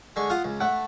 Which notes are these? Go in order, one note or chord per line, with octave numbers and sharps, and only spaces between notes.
D3 G#3 C#6
F4 F#5 D#6
C#2
A3 F#5